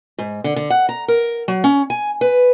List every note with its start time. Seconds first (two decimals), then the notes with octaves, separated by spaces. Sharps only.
0.19 G#2
0.44 D3
0.56 D3
0.70 F#5
0.89 A#5
1.08 A#4
1.48 F#3
1.64 C#4
1.90 G#5
2.21 B4